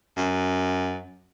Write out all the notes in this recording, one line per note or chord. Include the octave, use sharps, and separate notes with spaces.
F#2